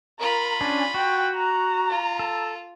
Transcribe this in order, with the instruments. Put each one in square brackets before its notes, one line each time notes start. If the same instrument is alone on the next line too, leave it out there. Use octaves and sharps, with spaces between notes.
[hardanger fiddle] F4 B5 [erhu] A#4
[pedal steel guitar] C#4 D4 [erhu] G#5
[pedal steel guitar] F#4 [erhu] G5
[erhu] A#5
[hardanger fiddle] F4
[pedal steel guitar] A4